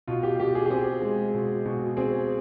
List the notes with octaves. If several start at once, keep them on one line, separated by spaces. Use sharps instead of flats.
B2 F4
G4
B2 G4
G#4
G4
C4 G#4
G#3
B2
B2
C4 G#4